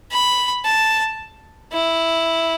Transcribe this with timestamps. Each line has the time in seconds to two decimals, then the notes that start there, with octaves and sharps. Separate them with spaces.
0.12 B5
0.65 A5
1.72 E4